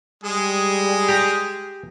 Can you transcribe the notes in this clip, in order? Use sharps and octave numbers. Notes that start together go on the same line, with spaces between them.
G3 G#3 G#4
G4 A#5